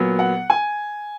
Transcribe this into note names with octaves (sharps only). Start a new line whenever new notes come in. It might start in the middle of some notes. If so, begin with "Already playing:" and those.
Already playing: A#2 F#3 B3
F#5
G#5